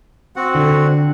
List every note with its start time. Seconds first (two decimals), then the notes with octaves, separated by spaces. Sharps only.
0.36 C4 F#4 F#5
0.55 D3